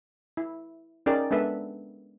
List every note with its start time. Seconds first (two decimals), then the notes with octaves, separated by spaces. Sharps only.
0.37 E4
1.06 C#4 D#4 G#4 A#4 D5 G5
1.31 G#3 B3 D4 A4 B4 E5